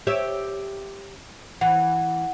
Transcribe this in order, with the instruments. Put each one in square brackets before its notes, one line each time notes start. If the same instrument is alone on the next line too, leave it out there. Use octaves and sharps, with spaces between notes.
[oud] G4 C#5 E5
[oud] E3 [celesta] F#5